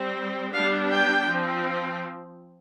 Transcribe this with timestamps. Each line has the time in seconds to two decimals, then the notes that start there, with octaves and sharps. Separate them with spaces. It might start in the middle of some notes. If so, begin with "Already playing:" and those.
Already playing: G3 C4
0.52 G3 B3 D4 F5
0.91 G5
1.29 F3 C4